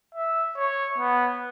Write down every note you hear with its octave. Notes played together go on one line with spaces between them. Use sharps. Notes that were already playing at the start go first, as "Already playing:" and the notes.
E5
C#5
B3